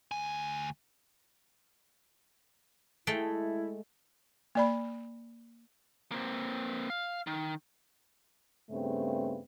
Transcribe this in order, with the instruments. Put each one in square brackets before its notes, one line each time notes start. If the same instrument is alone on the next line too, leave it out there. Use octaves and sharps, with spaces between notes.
[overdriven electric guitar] D2 G#5
[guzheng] G#3 A3 G5 [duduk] E4
[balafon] A#3 D5 B5
[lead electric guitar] A#3 C4
F5
D#3
[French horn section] G2 C#3 A3 B3 C4